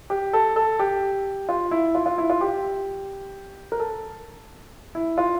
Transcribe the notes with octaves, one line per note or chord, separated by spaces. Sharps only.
G4
A4
A4
G4
F4
E4
F4
F4
E4
F4
G4
A#4
A4
E4
F4